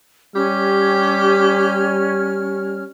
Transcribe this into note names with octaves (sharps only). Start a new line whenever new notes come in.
G3 C#4 G4 C#5 F6